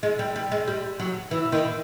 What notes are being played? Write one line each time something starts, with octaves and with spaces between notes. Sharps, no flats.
G#3
G3
G3
G#3
G3
F#3
E3
D#3